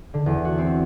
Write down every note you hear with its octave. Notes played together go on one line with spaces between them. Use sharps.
D3
E2
F#4
C4